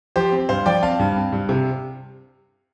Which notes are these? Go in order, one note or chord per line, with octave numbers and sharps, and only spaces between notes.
F3 G4 C5
C4
G2 C5 F5
F3 D5 G5
C4 F5 A5
G2
C4
G2
C3